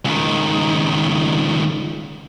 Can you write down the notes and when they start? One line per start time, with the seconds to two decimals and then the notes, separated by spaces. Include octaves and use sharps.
0.05 C#2 D#3